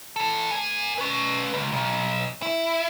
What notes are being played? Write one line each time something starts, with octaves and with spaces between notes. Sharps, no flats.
E3 A4
A#4 G#5
C#4 B4
C#2
B1
E4